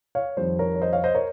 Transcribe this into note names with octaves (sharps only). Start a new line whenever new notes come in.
C#5 F5
F2 D#3 G3 C5
A#4 C#5
C#5
C5 D#5
C#5 F5
C5 D#5
A#4 C#5